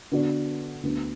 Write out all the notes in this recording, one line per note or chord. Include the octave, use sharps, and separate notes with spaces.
D3 B3 F#4 D5
D2 D3 B3